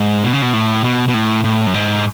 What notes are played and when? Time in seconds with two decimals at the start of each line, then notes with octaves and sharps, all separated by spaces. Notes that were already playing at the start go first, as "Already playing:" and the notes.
Already playing: G#2
0.24 B2
0.33 C#3
0.42 B2
0.53 A2
0.84 B2
1.08 B2
1.14 A2
1.44 A2
1.66 F#2
1.74 G#2